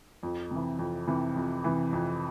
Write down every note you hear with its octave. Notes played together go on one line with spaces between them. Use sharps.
F2
C3 E3
F2
C3 E3
F2
C3 E3
F2